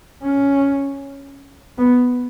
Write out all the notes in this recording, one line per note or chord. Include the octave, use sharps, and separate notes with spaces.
C#4
B3